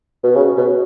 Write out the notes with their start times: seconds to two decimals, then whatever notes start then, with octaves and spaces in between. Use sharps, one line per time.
0.24 B2
0.36 C#3
0.57 B2